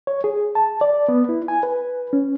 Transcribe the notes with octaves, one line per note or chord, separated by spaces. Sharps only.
C#5
G#4
A5
D5
B3
E4
G#5
B4
C#4